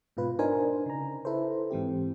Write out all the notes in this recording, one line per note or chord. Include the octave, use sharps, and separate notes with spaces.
G#2 B2 F4 B4
D4 D#4 A#4 C5 G#5
C#3 A#5
E4 A4 B4 C5
G#2 E3 C4 G4